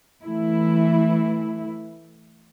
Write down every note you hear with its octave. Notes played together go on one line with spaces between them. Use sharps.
E3 A3 E4